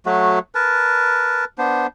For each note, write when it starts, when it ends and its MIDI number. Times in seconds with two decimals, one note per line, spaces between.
0.06 0.39 54
0.06 0.39 57
0.06 0.39 66
0.55 1.45 70
0.55 1.45 71
0.55 1.45 81
1.58 1.87 59
1.58 1.87 62
1.58 1.87 72